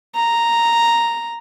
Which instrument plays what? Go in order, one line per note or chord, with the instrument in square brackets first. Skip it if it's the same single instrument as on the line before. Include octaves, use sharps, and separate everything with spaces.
[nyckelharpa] A#5